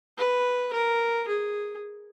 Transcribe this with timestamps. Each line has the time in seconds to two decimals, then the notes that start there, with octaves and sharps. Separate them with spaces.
0.18 B4
0.73 A#4
1.28 G#4